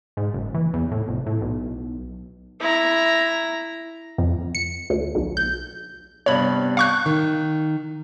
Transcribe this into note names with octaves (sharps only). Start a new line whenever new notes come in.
G#2
F#1
E3
E2
A2
F1
A2
B1
E4 A#5
F2
C#7
D2
B1
G6
G2 C3 B3 C#5 B5
F5 C#6 F#6
D#3